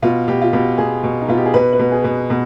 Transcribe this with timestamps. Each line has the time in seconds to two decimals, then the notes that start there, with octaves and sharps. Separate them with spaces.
0.02 B2 F4
0.28 B2 G4
0.42 F4
0.53 B2 G4
0.78 B2 G#4
1.03 B2
1.21 D#4
1.28 B2 F4
1.37 G4
1.46 G#4
1.54 B2 B4
1.73 B4
1.79 B2
1.92 G#4
2.04 B2
2.30 B2